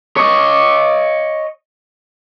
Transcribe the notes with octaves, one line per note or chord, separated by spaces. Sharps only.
C#5 D#5